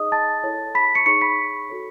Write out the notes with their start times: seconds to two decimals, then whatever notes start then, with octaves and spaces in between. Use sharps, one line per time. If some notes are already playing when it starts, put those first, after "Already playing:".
Already playing: D#4 G#4 C#5 D#5 D#6
0.12 A5 A6
0.43 E4 A4 C#5
0.75 B5 B6
0.95 C#6 C#7
1.06 D#4 G#4 C#5 C#6 C#7
1.21 B5 B6
1.70 F#4 A4 C#5